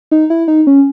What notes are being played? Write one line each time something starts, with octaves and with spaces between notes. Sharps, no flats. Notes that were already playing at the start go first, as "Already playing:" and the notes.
D#4
E4
D#4
C#4